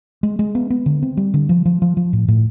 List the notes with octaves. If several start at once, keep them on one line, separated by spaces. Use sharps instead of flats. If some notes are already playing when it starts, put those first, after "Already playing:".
G#3
G#3
B3
B3
D3
C4
G3
D3
F3
F3
F3
F3
A2
A2